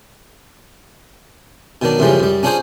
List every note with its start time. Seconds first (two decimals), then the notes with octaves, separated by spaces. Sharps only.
1.82 B2 D#3 F#3 D4
1.99 F#2 A2 C#3 E3 F3 G3
2.20 F#2 G3
2.43 C#4 D4 F4 G#4 C5 G#5